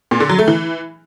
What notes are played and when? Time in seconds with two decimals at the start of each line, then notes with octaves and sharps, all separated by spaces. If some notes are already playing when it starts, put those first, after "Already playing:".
0.11 A#2
0.20 D3
0.29 F#3
0.39 A3
0.48 E3